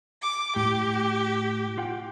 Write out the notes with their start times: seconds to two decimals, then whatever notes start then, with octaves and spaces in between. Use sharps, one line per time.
0.22 D6
0.56 A2 G4
1.78 F4 F#5 G5